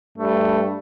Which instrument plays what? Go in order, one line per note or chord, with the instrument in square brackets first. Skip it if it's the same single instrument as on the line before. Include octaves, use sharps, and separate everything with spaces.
[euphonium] G2 [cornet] A3